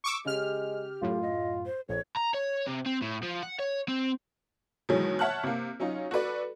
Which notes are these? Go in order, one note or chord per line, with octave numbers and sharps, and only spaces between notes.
C#6 D6 E6
C#3 G#3 G4 F6
F#2 A2 F4
D#5
C5
A#1 F2 C#5
A#5
C#5
C3
C4
A2
F3
F#5
C#5
C4
B2 D#3 E3 F#3 G#3
C#5 E5 F#5 A5 F6 F#6
C3 A#3
F#3 C#4 D#4 F4
F#4 A4 B4 D5